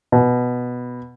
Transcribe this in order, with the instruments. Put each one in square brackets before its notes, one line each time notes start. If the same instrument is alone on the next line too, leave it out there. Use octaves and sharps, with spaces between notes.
[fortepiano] B2